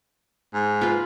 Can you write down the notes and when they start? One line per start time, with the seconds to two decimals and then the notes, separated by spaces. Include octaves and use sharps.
0.54 G#2
0.81 F4 B4